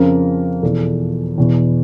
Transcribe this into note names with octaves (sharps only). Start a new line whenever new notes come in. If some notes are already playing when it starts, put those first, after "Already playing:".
Already playing: F2 C#3 F3 A#4
E2 B2 A4
E2 B2